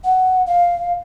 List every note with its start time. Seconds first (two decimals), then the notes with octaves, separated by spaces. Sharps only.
0.04 F#5
0.46 F5